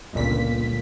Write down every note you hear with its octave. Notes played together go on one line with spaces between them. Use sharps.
G1 C#2 A#2 B6